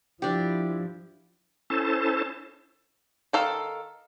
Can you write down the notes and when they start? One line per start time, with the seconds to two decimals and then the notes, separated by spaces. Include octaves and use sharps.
0.22 F3 D4 E4 G4
1.70 C#4 E4 A4 C5 A5
3.33 D#3 A4 F5